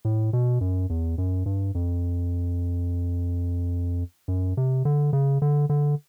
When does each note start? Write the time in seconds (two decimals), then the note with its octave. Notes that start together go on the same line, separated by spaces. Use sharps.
0.05 A2
0.33 B2
0.61 F#2
0.90 E2
1.18 F#2
1.46 G2
1.75 F2
4.28 F#2
4.57 C3
4.85 D3
5.13 C#3
5.42 D3
5.70 D3